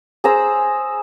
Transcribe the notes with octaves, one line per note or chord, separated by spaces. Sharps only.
G#4 C5 A#5 E6